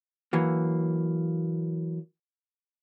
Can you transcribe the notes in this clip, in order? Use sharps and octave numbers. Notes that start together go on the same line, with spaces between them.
E3 F#3 A#3